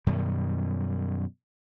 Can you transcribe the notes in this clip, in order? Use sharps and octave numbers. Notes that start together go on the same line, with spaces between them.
F#2 B2 D#3 G3